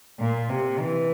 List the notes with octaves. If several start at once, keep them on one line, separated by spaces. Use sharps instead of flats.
A#2
C3
E3